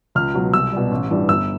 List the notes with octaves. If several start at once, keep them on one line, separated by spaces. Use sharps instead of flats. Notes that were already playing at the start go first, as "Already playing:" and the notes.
C#2 F6
B2 F#3
C2 E6
B2 G3
A1
G2 E3 G3
G1 E6